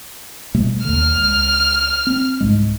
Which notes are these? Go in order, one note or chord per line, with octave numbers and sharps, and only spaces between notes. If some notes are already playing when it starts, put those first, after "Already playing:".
B2 G3 A3
D#2 D3 F6
C#2
C4
C2 G#2 G#3